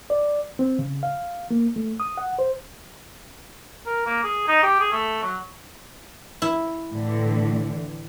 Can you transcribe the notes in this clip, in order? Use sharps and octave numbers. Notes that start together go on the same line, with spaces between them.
D5
C4
C#3
F5
A#3
A3
D#6
F#5
C5
A#4
A#3
G#4
D#4
G4
G#4
A3
F#3
E4
A2 D3 E3